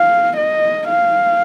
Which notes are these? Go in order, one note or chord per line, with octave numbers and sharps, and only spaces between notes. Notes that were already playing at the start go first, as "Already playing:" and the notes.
Already playing: F5
D#5
F5